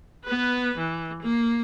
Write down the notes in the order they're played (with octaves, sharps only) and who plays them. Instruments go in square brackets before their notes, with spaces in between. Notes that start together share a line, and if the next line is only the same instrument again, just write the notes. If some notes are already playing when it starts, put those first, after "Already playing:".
[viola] B3 B4
E3
A#3